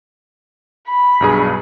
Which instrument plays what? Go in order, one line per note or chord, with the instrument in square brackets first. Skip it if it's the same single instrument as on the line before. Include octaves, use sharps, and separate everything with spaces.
[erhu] B5
[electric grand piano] B1 G2 G#4